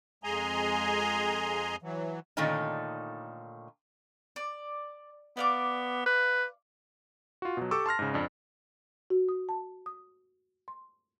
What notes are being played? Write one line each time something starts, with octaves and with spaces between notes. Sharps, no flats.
F2 G#3 G#4 G#5 A#5 C6
E3 F#3
A#2 D3 D#3 A3 C#4 D#4
D5
B3 D5 F5 D6
B4
F4 F#4
B2 F#3
G4 A4 C#6 D6 E6
A5 C6 F6 A#6
G#2 C#3
F2 D4
F#4
D#6
A5
D#6
C6